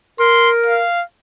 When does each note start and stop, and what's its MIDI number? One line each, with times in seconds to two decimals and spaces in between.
0.19 0.84 70
0.19 0.50 84
0.66 1.03 77